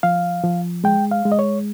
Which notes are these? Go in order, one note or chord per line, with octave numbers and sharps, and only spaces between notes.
F3 F5
F3
G#3 G5
F5
G#3
D#5
C#5